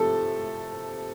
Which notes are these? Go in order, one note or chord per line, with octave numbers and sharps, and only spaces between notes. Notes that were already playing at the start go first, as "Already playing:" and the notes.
Already playing: C3 F3 A3 A4